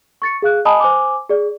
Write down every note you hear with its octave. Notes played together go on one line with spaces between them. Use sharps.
C#6 A6 C#7
G#4 F5 F#6
D#5 G#5 A5 B5 D#6
C5 G#5 D6
G#4 D5